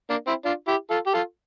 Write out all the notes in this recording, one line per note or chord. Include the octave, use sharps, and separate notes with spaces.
A#3 D4
C4 E4
D4 F4
E4 G4
F4 A4
G4
F4 A4